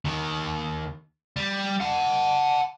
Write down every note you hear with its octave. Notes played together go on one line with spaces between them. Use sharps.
D#2 D#3
G3
F#5 A5